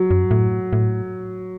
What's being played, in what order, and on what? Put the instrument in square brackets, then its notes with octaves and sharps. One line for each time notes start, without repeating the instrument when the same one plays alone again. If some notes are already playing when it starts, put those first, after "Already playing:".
Already playing: [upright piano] F#3
[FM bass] F#2
A2
A2